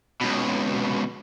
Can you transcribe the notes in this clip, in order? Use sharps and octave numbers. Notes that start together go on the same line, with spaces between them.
C#2 B2